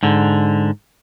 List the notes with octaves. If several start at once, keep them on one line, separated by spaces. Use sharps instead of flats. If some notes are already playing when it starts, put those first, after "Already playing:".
G#2 D3